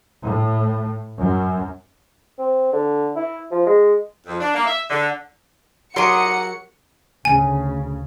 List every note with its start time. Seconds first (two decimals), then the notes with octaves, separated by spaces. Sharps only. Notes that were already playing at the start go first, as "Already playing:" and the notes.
0.24 A2
1.18 F#2
2.38 C4
2.73 D3
3.16 E4
3.51 F3
3.66 G#3
4.26 F2
4.40 D4
4.54 A#3
4.66 E5
4.89 D3
5.96 F#3 G4 A#4 F#5 C6 D6 D#6 C#7
7.25 D2 C#3 G#5